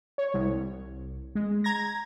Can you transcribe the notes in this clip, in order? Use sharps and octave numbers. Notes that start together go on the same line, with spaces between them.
C#5
C2
G#3
A#5 G#6 A#6